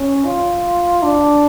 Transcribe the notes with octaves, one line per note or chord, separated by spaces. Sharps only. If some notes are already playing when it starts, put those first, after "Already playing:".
Already playing: C#4
F4
D4